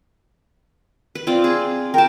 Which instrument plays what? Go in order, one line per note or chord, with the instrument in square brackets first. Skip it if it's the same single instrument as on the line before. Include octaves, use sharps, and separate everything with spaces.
[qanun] B4
C4 F4 D5
G#4
[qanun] A#4 A5 [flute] G5